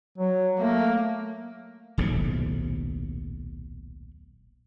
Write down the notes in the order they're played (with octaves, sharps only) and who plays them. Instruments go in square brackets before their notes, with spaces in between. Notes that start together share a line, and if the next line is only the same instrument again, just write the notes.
[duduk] F#3
[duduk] A3 [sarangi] A#3
[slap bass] D#1 B1 A2 C3